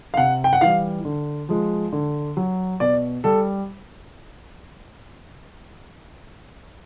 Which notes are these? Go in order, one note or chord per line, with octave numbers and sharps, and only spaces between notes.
F5
C3 F#5
G5
F#5
E3 G3 F5
D3
F3 G#3
D3
F#3
B2 D5
G3 A4